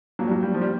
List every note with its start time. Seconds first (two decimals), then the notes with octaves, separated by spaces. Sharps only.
0.19 F3 F#3 A#3 D4
0.27 G3
0.31 F#3
0.43 G3
0.54 F3
0.62 G3